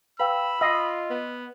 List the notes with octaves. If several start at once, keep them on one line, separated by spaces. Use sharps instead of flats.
B4 F5 G5 B5 E6
F4 D#5 E6 A#6 C7
B3